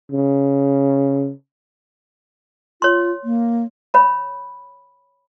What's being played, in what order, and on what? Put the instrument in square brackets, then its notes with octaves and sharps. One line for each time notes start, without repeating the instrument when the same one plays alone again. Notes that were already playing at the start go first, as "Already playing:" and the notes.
[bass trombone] C#3
[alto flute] F4 [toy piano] C#5 C6
[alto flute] A#3
[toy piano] C#5 B5